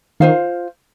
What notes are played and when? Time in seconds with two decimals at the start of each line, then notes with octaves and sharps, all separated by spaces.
0.20 D#3 F4 C5 F5